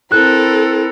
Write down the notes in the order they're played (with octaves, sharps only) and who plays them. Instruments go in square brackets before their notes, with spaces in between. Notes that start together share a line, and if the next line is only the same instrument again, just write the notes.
[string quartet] C4 A#4 [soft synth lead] E4 [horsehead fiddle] A4 [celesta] F#6